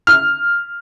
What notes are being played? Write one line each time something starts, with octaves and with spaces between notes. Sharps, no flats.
F6